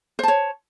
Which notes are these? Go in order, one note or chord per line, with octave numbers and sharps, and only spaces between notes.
C5 C#5 A5